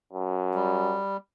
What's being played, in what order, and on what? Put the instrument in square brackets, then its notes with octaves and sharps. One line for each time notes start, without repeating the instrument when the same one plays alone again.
[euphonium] F#2
[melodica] G3